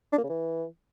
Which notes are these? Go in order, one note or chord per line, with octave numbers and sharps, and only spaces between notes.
D4
A#3
C#3
E3